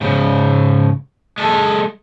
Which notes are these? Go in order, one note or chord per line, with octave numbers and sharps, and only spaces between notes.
G#2 C#3
G#3 A4